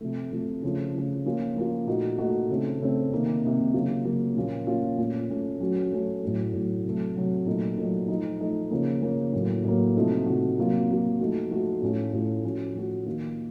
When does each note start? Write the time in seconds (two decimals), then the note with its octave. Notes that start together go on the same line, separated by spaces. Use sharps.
0.01 C3 F3 A3
0.32 C3 F3 A3
0.63 C#3 F3 A3
0.94 C#3 F3 A3
1.25 F3 A#3 C#4 F4
1.56 F3 A#3 C#4 F4
1.87 A#2 A3 D#4 F#4
2.18 A#2 A3 D#4 F#4
2.49 C#3 A3 C4
2.81 C#3 A3 C4
3.12 C3 D#3 A#3
3.43 C3 D#3 A#3
3.74 C#3 F#3 A#3 F4
4.05 C#3 F#3 A#3 F4
4.36 A#2 F3 A#3 C#4 F4
4.67 A#2 F3 A#3 C#4 F4
4.98 A#2 A3 C#4
5.30 A#2 A3 C#4
5.60 F#3 A3 C#4 F#4
5.92 F#3 A3 C#4 F#4
6.22 A2 F#3 A3
6.53 A2 F#3 A3
6.84 C3 F#3 A3
7.16 C3 F#3 A3
7.46 A#2 F#3 A3 D#4
7.78 A#2 F#3 A3 D#4
8.08 F3 A3 D#4
8.41 F3 A3 D#4
8.71 C#3 F3 A#3
9.02 C#3 F3 A#3
9.33 A2 F#3 A#3
9.64 A2 F#3 A#3
9.95 C3 F3 A3 D#4 F#4
10.26 C3 F3 A3 D#4 F#4
10.58 C3 F#3 A#3 F4
10.89 C3 F#3 A#3 F4
11.20 F3 A3 D#4 F#4
11.51 F3 A3 D#4 F#4
11.82 A2 A3 C#4 F4
12.13 A2 A3 C#4 F4
12.44 F3 A3 C#4 F#4
12.75 F3 A3 C#4 F#4
13.06 D#3 A#3 F4